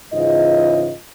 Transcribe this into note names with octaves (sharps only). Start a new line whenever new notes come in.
G#2 C#3 E3 F4 D#5